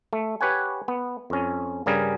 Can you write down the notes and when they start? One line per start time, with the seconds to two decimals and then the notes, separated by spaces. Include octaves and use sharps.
0.13 A3
0.41 G4 B4 C#5 F#5 G#5
0.88 B3
1.30 F2 C#4
1.86 G2 C#3 G3 G#4 A#4